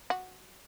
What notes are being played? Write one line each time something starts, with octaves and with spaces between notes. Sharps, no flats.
F#4